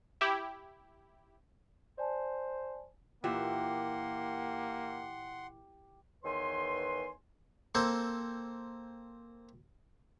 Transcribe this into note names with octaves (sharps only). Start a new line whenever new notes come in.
E4 G4
C5 D5 G#5 A5
A#2 E3 A#3 G4 E5 F#5 C6
E2 D#3 B4 C#5 G#5 C6
A#3 C4 A4 C5